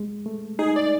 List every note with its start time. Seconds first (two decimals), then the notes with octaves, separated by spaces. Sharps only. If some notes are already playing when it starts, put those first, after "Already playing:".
Already playing: G#3
0.26 A3
0.59 D#4 G#4
0.76 D5